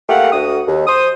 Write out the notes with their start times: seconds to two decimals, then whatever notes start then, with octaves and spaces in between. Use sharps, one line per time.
0.08 A3 A#3 G4 F5 F#5
0.32 D2 F#4 D#6
0.67 D#2
0.87 C5 D#6